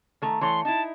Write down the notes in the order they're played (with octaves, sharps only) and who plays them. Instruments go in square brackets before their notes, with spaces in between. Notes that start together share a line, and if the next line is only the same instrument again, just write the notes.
[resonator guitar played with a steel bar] D#3 A3 A#5
[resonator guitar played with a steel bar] E3 A3 C#5 [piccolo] C6
[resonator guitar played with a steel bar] D#4 E4 [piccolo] A5